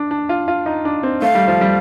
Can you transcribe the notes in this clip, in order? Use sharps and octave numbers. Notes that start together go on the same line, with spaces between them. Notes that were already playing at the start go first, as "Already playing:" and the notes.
Already playing: D4
D4
F4
F4
D#4
D4
C4
A3 F5
G3
F3
G3